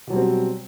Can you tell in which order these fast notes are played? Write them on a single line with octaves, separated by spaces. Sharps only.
B2 F#3 G3 C4